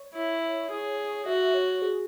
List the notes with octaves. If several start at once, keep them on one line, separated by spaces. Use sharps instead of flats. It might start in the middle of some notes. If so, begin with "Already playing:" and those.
Already playing: C#5
E4
G#4
F#4 E5
C#5
G#4